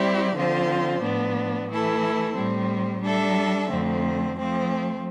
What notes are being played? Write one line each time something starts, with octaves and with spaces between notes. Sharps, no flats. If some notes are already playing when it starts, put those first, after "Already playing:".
Already playing: G3 C4 E4 G4 D5
D3 F3 C4 F4 C5
A2 F3 B3 D4
E3 A3 E4 A4
A2 G3 C4
G3 D4 A4 E5
F2 D3 A3 C4
F3 A3 C4